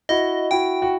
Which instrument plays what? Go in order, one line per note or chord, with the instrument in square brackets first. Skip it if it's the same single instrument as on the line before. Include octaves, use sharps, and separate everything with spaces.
[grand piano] E4 F#4 [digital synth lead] D#5
[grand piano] E4 F#4 [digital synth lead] G5
[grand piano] F#4